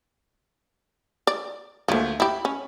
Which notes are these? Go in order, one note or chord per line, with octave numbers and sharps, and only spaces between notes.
D5
D2 F3 A3 A#3
E4 G4 B5
C#4